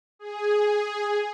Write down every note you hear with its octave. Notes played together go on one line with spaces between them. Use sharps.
G#4